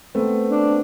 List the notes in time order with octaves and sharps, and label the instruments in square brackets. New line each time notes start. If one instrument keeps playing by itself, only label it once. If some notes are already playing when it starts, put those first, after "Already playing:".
[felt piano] A3 [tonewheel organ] B3 C4
[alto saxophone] D4